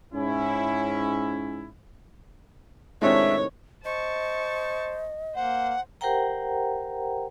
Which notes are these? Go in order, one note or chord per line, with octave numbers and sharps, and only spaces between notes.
G#2 C#4 E4
A2 C3 D#3 G#3 D4 C#5 E5
C5 D#5 A5 C#6
A#3 C5 F#5
G4 A#4 C5 F#5 G5 A#5